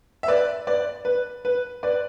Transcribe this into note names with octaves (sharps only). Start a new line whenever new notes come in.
E5
B4 D5
B4 D5
B4
B4
B4 D5